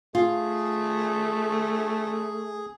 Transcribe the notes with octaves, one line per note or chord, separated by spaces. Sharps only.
A3 F4 G#4